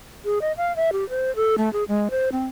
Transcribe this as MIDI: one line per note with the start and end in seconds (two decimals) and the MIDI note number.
0.25 0.39 68
0.42 0.52 75
0.57 0.75 77
0.76 0.90 76
0.93 1.08 67
1.09 1.34 72
1.36 1.56 69
1.58 1.71 57
1.73 1.84 68
1.88 2.08 56
2.11 2.29 72
2.32 2.45 60